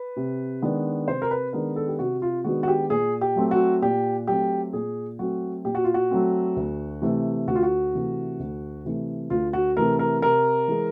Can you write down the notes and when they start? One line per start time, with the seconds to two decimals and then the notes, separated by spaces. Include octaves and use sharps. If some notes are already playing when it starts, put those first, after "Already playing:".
Already playing: B4
0.16 C3
0.62 D#3 G#3 B3 D4
1.08 C3 C5
1.22 A#4
1.31 B4
1.53 D#3 G#3 B3 D4 A#4
1.76 A4
1.88 G4
1.99 C3 F#4
2.22 F4
2.44 D#3 G#3 B3 D4 F#4
2.63 F#4
2.68 G4
2.90 A#2 G#4
3.21 G4
3.36 F#3 A3 C4
3.51 F#4
3.82 A#2 G4
4.27 F#3 A3 C4 G4
4.73 A#2 G#4
5.19 F#3 A3 C4 F#4
5.65 A#2 G4
5.75 F#4
5.84 F4
5.94 F#4
6.11 F#3 A3 C4
6.56 D2
7.02 C3 E3 A3
7.47 D2 F#4
7.55 F4
7.63 F#4
7.94 C3 E3 A3
8.40 D2
8.85 C3 E3 A3
9.30 D2 F4
9.53 F#4
9.76 C3 E3 A3 A#4
9.99 A#4
10.22 C3 A#4
10.68 E3 G#3